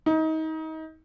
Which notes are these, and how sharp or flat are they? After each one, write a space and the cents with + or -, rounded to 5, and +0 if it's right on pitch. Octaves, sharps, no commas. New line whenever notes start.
D#4 +30